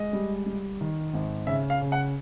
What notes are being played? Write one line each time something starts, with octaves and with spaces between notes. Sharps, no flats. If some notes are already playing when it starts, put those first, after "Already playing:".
Already playing: G#3 D#5
G3
G3
D#3
G#1
C#3 E5
F5
C#3
F#5